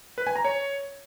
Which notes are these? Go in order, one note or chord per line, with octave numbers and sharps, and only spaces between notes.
B4
G#5
A#5
C#5